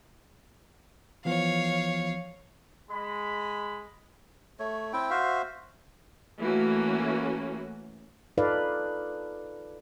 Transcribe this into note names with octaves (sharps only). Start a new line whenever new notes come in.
E3 F3 B3 C#5 F5
G#3 B5
A3 C#5
C4 E4 G5
F#4 C5 E5 F5
E3 A3 A#3 C#4 F#4
D#4 F4 A4 B4 D5 F5